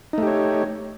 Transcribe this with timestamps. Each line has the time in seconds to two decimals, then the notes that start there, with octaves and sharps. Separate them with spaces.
0.13 D#4
0.18 A3
0.22 G4
0.27 C#5